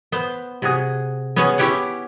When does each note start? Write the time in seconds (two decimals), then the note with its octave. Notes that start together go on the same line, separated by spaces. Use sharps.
0.12 B3 C5
0.62 C3 F#4 G#4
1.36 B3 C#4 F#4 G#4
1.58 C#4 E4 G4 C#5 F#5